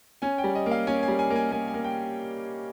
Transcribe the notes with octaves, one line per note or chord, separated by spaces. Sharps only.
C#4 G#5
G5
G3
D#5
A#3
F5
C#4 G#5
G#5
G3
G#5
A#3
G#5
A#3 G#5
G#5
A#3
G5